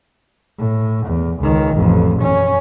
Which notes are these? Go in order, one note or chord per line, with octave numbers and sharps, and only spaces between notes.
A2
E2
C#2 D#3
A1 F2
F#2 C#4